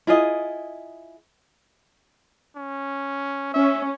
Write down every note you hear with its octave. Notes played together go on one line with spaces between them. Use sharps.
E4 F4 G#4 D#5
C#4
C#4 E5